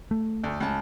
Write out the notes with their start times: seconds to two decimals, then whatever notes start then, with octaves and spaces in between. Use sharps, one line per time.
0.11 A3
0.44 D2
0.60 C#2 A5